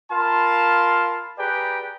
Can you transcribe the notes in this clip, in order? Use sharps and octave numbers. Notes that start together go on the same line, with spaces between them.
F4 A#4 F5 A5 B5 C6
G4 G#4 B4 D5 G5 A#5